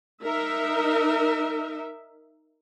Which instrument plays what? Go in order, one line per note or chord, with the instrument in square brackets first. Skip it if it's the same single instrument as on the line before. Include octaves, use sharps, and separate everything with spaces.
[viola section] D#4 A#4 E5